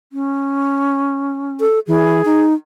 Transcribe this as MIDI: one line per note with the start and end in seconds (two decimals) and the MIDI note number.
0.13 1.64 61
1.60 1.79 69
1.87 2.22 52
1.87 2.43 68
2.25 2.54 63